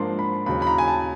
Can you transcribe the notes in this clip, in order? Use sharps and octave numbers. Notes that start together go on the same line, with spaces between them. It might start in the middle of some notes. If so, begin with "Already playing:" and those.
Already playing: G#2 F3 A#3 D4 C6
B5
D#2 C#3 F#3 B5
B5
A#5
G#5
A5